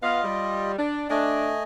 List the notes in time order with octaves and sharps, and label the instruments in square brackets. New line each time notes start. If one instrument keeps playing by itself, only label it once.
[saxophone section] B3 F5 [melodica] F4 D#5
[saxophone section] G3
D4
[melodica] A3 D#5 G#5 [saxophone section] D4